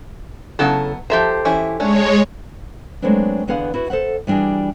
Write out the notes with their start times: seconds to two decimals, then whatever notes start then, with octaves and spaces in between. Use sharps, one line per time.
0.59 C#3 F#3 B3 E4 A4 A5
1.10 F3 G4 A4 C5 E5 A#5
1.45 E3 C#4 E4
1.80 G#3 A3 C#4 D4 C#5
3.02 F#3 G#3 A3 B3 C4 D4
3.48 E2 D3 B3 G#4 F5 F#5
3.74 E4 F#4 B4
3.90 A4 C5 E5 F#5
4.27 E3 G3 D4 F#4 G#4